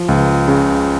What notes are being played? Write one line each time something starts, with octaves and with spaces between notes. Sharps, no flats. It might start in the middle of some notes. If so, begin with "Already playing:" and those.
Already playing: F3
C#2
C#3